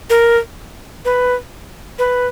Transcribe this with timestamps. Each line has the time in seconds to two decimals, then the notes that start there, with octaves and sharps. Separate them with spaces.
0.10 A#4
1.05 B4
1.99 B4